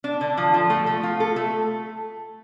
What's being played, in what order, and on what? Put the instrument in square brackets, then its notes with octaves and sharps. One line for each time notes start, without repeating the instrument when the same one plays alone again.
[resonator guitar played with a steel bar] D4
D3
F3
F3
A3
A3
F4
A4
A3